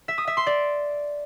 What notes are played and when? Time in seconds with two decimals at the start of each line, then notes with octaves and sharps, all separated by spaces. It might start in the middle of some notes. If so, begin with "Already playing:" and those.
0.08 E5
0.18 D#6
0.27 E5
0.37 C6
0.47 D5